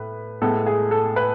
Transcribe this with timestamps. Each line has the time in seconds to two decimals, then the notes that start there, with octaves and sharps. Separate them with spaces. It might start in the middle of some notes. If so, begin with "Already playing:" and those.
Already playing: A2 A3 B4
0.41 A2 G#3 B3 A4
0.66 G#4
0.91 A4
1.16 B4